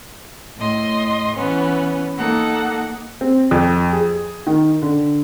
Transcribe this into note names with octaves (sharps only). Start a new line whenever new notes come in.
A2 D#5 C6
E3 B3 C#4
A#3 D#4 A4 F#5
C4
F2
G#4
D#3
D3